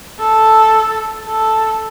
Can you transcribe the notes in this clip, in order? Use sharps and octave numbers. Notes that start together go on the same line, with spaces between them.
A4
A4